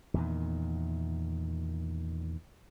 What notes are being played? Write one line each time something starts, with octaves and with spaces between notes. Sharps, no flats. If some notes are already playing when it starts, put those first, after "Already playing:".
E2 A#2 D#3